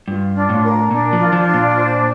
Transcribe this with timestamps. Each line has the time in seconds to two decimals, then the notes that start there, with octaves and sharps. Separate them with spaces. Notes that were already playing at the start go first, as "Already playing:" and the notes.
0.08 G2 F4
0.36 D4
0.50 A2
0.63 A#4
0.91 A#2 D4
1.13 F3
1.20 F4
1.33 F3
1.47 D4
1.54 A#2
1.74 C5